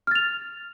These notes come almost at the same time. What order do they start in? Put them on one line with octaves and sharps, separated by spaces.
F6 A6 F7